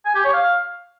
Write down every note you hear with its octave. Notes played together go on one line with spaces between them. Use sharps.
G#5
G4
C#5
F5